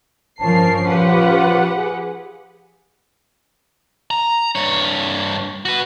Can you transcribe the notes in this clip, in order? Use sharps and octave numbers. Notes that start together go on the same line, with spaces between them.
G2 F3 C#4 A#4 A5 C7
F4 G4 B4 F#5
G#4
A#5
G2 C#5
F#4 B4